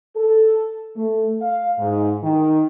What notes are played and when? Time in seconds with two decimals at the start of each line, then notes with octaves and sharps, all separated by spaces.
0.16 A4
0.96 A3
1.42 F5
1.79 G#2
2.23 D#3